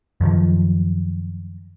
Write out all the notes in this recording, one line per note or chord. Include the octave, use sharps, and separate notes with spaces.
F#2 D#3 F3